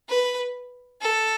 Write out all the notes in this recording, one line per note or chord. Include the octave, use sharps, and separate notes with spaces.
B4
A4